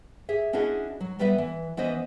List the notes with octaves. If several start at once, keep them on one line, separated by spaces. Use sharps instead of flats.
G4 G#4 E5
C#4 D4 E4 F#4 G#4 D#5
F#3
A2 G3 B3 B4 E5
E3
E3 B3 C#4 B4 C5 D#5